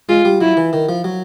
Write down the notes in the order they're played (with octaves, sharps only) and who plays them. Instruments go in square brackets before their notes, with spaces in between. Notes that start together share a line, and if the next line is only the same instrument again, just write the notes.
[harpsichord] G#3 [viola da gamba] F4
[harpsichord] G3
[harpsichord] F#3 [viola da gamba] E4
[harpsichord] E3
D#3
F3
F#3